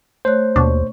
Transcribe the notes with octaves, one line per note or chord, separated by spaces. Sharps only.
A3 C5 C#5 F#6
D#2 B2 D4 C#6